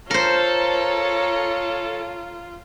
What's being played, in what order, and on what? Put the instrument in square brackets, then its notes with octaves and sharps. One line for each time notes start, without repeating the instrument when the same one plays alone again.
[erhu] F4 [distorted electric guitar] A4 [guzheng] A#4 C5 [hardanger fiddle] C#5 A#5